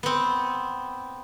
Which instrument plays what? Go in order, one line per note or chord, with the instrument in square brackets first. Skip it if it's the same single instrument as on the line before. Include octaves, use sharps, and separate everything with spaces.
[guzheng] B3 C4